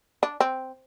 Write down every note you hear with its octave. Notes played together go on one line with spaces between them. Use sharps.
D4
C4